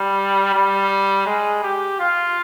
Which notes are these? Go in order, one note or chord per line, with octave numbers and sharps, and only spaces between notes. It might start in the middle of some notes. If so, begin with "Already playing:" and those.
Already playing: G3
G3
G#3
G4
F4